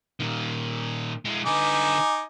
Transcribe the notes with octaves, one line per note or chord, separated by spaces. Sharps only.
A#2 D#3
G#3 E4
D3 D#4 B4 G#5 D6